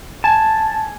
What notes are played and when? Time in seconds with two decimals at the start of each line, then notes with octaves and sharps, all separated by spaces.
0.24 G#5 A5